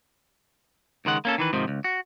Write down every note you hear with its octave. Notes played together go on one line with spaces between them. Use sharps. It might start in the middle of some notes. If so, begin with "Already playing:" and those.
C#2 D#3 G#3 F#5
A#3 C#4 A4
D#3 E3 B4
G#2 C3 D#3 F3
C#2
F#4